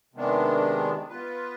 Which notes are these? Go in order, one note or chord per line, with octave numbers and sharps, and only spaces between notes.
C3 D#3 G#3 B3 D4
B3 F4 B4